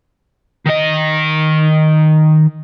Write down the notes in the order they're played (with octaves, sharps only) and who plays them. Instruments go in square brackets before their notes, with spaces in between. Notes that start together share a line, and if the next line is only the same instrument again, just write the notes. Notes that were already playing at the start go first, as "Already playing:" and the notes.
[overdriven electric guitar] D#3 D#5